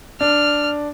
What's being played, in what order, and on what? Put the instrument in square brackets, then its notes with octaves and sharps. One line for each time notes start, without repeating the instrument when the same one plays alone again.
[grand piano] D4 [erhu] F6